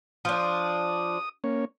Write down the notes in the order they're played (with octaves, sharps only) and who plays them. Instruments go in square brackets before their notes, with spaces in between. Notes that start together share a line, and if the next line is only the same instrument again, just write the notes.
[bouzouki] F3 D4 [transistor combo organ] D#6
[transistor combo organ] A#3 C#4 C#5